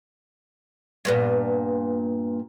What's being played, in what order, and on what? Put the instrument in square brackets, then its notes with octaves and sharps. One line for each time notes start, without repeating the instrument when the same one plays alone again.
[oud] G2 A#2 B3